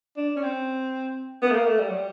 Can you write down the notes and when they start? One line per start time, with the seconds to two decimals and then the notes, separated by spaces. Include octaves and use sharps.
0.17 D4
0.36 C#4
0.43 C4
1.42 B3
1.50 A3
1.55 A#3
1.67 A3
1.79 G3
1.88 F#3
1.96 G3